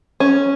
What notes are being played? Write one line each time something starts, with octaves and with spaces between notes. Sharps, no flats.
C#4